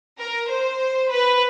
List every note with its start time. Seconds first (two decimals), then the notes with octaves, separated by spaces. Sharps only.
0.19 A#4
0.50 C5
1.11 B4